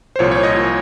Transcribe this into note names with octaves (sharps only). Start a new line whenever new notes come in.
C5
C2 A#2 F3 C#5
C#5
D#5
A#2 F3